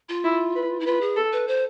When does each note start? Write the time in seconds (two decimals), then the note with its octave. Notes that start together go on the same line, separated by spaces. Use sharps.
0.09 F4
0.24 E4
0.55 B4
0.80 E4
0.86 F4 B4
1.01 G#4
1.17 A4
1.33 B4
1.48 C5